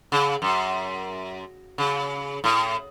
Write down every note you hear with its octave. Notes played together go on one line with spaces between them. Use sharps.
C#3
F#2
C#3
A2